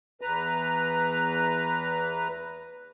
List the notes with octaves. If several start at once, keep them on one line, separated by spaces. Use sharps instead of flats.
E2 B4 A#5